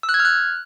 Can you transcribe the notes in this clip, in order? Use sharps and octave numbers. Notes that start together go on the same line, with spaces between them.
E6
F#6
G#6
F6
F#6